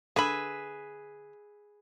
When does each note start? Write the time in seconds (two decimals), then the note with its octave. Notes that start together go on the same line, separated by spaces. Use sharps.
0.16 D3 G#4 B4 E5 B5